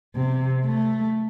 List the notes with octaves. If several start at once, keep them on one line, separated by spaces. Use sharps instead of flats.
C3
A3